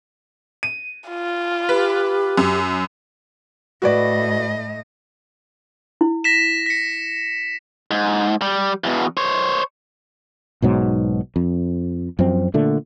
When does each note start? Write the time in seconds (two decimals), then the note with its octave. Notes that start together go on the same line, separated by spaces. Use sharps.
0.63 D#7
1.08 F4
1.69 G4 B4
2.38 F#2
3.82 A2 F#4 B4 D5 D#5
6.01 E4
6.24 A#6 B6 E7
6.66 B6 C#7
7.91 G#2
8.42 G3
8.84 E2 B2
9.17 C5 C#5
10.62 B1 G#2 B2 F#3
11.36 F2
12.19 F#2 F3 C4
12.54 A#2 D3 A3